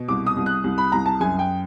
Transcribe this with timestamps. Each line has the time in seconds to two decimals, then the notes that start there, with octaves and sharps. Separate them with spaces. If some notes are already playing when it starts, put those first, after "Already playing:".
Already playing: B2
0.08 C2 D6
0.26 D#6
0.36 C2
0.46 F#6
0.64 C2
0.78 B5
0.92 C2 A#5
1.06 A5
1.20 F#2 G#5
1.39 G5